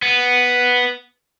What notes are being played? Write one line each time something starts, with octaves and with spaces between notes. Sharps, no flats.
B3